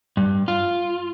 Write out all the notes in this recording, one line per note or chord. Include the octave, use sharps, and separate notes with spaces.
G2
F4